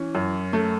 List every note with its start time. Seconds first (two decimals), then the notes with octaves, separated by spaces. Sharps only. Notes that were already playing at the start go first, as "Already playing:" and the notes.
Already playing: E3 C#4
0.15 F#2
0.53 A3